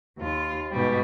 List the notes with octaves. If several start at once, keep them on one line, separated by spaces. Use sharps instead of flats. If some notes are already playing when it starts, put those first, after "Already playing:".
D#2 F4
G#2 B2 G3